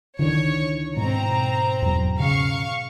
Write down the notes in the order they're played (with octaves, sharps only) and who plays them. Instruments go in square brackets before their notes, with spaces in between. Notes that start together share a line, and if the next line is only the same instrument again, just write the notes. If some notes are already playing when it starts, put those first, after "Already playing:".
[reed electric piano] C#2 D4 E4 [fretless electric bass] D3 D#3 [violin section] C#5
[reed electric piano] G#2 B2 [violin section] C4 A#5
[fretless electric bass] E2 F#3
[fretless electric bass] C#3 [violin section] F5 C#6